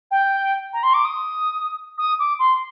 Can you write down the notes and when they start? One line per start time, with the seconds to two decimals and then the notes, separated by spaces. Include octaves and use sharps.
0.11 G5
0.73 A#5
0.83 C6
0.94 D6
1.04 D#6
1.98 D#6
2.19 D6
2.39 C6